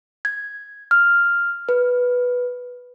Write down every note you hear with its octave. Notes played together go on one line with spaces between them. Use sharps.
G#6
F6
B4